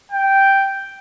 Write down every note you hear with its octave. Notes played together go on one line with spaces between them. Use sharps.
G5